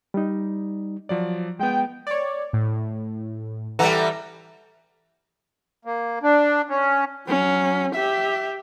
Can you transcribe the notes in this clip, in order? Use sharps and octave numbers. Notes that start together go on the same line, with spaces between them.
G3 D#4
F3 F#3 D5
G#3 B3 G5
C#5 D5
A2
E3 G3 A4 F#5 A#5
A#3
D4
C#4
F#3 C#4
G4 E5